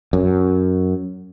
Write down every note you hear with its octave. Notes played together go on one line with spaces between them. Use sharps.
F#2